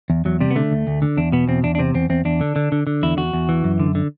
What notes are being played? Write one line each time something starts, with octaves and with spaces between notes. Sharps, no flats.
E2
E2 F#3
C3 G3
B3
D3 A3
D2
D2
D3
E2 D4
B2 B3
E2 C4
E2 D4
D4
C3 C4
E2 C4
E2 C4
E2 D4
D3
D3
D3
D3
E2 E4
E2 F#4
E2
E3
F#2
D3
D3